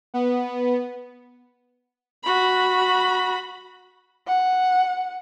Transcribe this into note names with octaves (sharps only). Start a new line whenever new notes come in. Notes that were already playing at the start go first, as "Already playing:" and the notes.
B3
F#4 B5
F#5